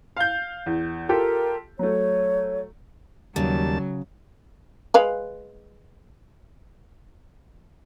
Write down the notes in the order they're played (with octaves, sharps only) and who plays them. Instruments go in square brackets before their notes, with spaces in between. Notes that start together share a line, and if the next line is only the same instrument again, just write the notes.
[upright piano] F5 G6
E2
[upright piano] F4 G4 A4 [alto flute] A#4
[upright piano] F#3 A3 [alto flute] C#5
[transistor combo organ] D#2 G3 A5 [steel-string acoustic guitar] C#3 [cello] F#3
[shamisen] G#3 B4 F5